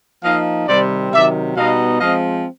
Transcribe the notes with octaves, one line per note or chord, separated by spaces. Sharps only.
F3 A#3 D#4 D#5 F5
C3 D#3 G3 C4 C5 D5
C3 D#3 F#3 D5 E5
B2 G3 B3 D#4 D#5 F5
F3 G#3 C4 D#5 F5